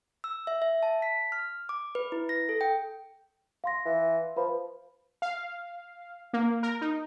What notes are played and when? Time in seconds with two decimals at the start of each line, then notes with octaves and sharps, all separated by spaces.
0.24 E6
0.47 E5
0.62 E5
0.83 A5
1.02 B6
1.32 F6
1.69 D6
1.95 B4
2.12 E4
2.29 A#6
2.49 A4
2.61 G5
3.64 F5 C6 A#6
3.85 E3
4.37 F3 B4 B5
5.22 F5
6.33 A#3
6.63 A#4
6.81 D#4